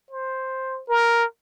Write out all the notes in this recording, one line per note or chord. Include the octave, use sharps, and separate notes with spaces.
C5
A#4